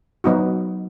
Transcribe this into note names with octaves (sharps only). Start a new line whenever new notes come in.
F#3 B3 D#4 F#4